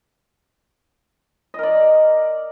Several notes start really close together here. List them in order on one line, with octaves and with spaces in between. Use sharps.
D#5 A#4 D5